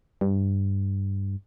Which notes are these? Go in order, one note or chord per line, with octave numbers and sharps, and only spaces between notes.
G2